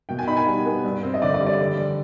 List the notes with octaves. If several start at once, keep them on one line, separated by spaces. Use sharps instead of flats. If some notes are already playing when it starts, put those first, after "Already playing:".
B2 G5
G#5
D#4 B5
G#5
G3
B3
G2
C4
D#5
D3 D5
D5
G3
D5
D3
D3